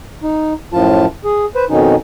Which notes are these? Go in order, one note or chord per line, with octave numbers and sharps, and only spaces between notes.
D#4
F#2 A2 F3 F4 A5
G#4
B4 C5
F2 B2 D#3 C#4 D#4